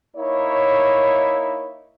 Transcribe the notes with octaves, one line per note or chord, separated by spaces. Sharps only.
A#3 D#4 E4 C#5